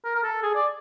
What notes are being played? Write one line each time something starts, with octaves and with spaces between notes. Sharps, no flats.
A#4
A#4
A4
G#4
D5